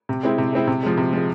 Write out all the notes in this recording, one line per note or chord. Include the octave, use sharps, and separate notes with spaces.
C3
G#3 C4 E4
C3
G#3 C4 E4
C3
F3 G#3
C3
F3 G#3